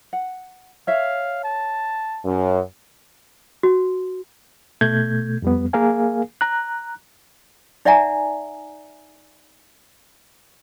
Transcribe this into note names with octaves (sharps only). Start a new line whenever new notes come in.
F#5
C#5 E5 F5
A5
F#2
F#4
B2 A3 G6 G#6
F2 G3 B3
A#3 G#4 A#4 F5 G#5
A#5 F#6
D#4 D5 E5 F#5 G#5 A#5